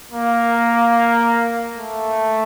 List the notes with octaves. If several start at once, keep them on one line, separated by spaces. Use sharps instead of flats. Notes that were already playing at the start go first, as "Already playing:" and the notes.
A#3
A3